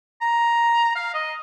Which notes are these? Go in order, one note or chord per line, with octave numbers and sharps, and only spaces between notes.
A#5
F5
D#5